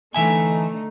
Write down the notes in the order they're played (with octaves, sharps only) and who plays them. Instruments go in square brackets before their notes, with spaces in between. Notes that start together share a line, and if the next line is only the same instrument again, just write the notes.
[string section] D3 A3 D#4 [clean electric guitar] E3 E5 G#5